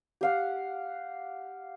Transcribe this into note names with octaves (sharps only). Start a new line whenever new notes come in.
G4 F5 F#5